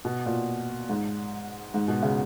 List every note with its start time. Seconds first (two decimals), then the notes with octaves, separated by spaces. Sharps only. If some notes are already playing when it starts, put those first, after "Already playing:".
0.05 B2
0.26 A#2
0.89 G#2
1.74 G#2
1.88 B2
2.02 C#3